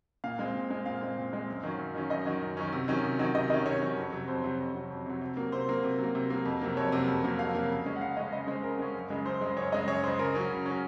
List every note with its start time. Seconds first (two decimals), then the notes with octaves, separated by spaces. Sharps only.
0.24 A#2 F5
0.39 G#3 C4
0.54 A#2
0.70 G#3 C4
0.86 A#2 F5
1.01 G#3 C4
1.17 A#2
1.32 G#3 C4
1.48 F#2
1.63 D#3 F#3 C#4
1.79 F#2
1.94 D#3 F#3 C#4
2.10 F#2 D#5
2.25 D#3 F#3 C#4
2.41 F#2
2.57 D#3 F#3 C#4
2.72 C3
2.88 D#3 F#3 C#4
3.04 C3
3.19 D#3 F#3 C#4
3.35 C3 D#5
3.50 D#3 F#3 C#4 D#5
3.65 C3 C#5
3.82 D#3 F#3 C#4
3.97 F2
4.12 C3 F#3
4.28 F2 C5
4.44 C3 F#3
4.59 F2
4.74 C3 F#3
4.90 F2
5.06 C3 F#3
5.21 C3
5.37 F#3 A#3
5.52 C3 C5
5.68 F#3 A#3
5.83 C3
5.99 F#3 A#3
6.15 C3
6.30 F#3 A#3
6.45 F2
6.61 C3 F#3 A#3
6.77 F2 C#5
6.92 C3 F#3 A#3
7.08 F2
7.23 C3 F#3 A#3
7.39 F2 F5
7.55 C3 F#3 A#3
7.70 C#3
7.86 G#3 C#4
7.96 F#5
8.01 C#3 F5
8.17 G#3 C#4 D#5
8.32 C#3 D#5
8.48 G#3 C#4 C5
8.63 C#3 A#4
8.79 G#3 C#4
8.95 F#2
9.10 C#3 G#3
9.26 F#2 C5
9.41 C#3 G#3
9.57 F#2 C#5
9.72 C#3 G#3 D#5
9.88 F#2 C#5
10.03 C#3 G#3 C5
10.19 C#3 A#4
10.35 F#3 C#4
10.51 C#3
10.66 F#3 C#4